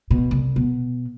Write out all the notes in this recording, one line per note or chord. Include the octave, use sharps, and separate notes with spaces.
B2
C2
B2